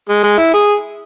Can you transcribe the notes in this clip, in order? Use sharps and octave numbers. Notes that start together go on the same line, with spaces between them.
G#3
G#3
E4
G#4